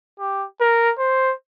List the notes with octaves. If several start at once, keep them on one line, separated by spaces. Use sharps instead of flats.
G4
A#4
C5